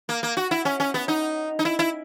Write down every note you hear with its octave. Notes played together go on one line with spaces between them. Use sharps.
A#3
A#3
F#4
E4
C#4
C#4
B3
D#4
D#4
E4
E4